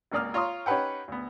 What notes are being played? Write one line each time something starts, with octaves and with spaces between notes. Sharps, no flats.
G#1 C#2 A#3 D5 D#6 F6
F4 C#5 A#5 C6 D#6
C#4 D#4 G4 B4 F#5 G5
D2 B3